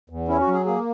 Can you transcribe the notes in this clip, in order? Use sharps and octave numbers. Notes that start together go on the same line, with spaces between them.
E2
C#4 E4
F#4
F#3
G#4
A#3 G#4